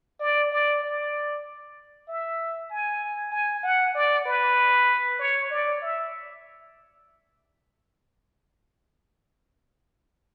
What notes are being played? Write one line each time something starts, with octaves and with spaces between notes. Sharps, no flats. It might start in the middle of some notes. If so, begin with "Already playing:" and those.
D5
D5
D5
E5
G#5
G#5
F#5
D5
B4
C#5
D5
E5